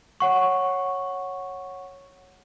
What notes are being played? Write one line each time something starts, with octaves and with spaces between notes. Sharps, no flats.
C#5 F#5 C#6